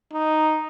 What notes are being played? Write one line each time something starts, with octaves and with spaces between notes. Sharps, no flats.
D#4